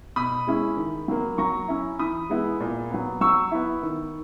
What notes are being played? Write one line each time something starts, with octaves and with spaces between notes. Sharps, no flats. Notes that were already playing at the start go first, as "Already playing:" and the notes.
B2 B5 D#6
G#3 C#4 E4
D#3
F#3 A#3
F#3 A#5 C#6
C#4 E4
E3 B5 D#6
G#3 B3 E4
A#2
F#3 B3
F#3 C#6 E6
B3 E4
D#3